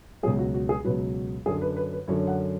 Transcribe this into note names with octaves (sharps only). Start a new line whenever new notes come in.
C#2 B2 F#3 G#4
F#4
F#4
G#4
C#2 B2 F#3 B4
F#2 D3 F#3 G#4
B4
B4
B4
F#2 D3 F#3 C#5
F#5